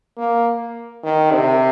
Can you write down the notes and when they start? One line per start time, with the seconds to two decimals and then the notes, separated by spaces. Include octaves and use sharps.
0.17 A#3
1.04 D#3
1.32 C3